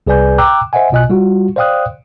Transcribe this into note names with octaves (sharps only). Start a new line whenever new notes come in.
C2 G#4 B4 D5 G#5 G6
G5 A#5 D6 E6 F#6
C5 D#5 E5 F#5 G#5
B1 B2 F4 D#5 G#5 F#6
G3 F4 F#4
C5 D5 F5 G5 D#6 F#6